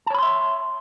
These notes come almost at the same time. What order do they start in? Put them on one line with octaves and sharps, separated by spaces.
A5 C#5 B5 C6 E5